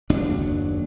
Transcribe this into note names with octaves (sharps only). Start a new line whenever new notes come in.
F#1 D#2 F#3 D4